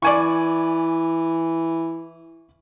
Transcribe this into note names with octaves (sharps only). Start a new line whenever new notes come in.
E3 D5 G#5 C#6